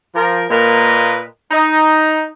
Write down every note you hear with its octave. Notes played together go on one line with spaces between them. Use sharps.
F3 A#4
A#2 A#3 A#4 B4 D#5
D#4